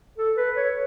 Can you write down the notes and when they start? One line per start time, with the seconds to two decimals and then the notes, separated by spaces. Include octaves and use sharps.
0.18 A4
0.37 B4
0.57 C#5